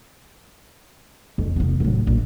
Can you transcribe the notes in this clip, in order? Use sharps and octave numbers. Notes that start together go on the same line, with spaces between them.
F2
F1 B3
A2 F#3
A#1